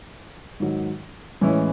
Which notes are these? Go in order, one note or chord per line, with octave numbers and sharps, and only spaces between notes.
G#2 D#3 F#3
A2 E3 G#3 C#4 E4